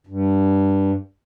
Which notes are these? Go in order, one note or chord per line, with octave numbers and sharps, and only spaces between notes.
G2